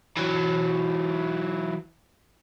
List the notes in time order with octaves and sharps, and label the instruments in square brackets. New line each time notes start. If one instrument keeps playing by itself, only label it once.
[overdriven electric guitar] E3 F#3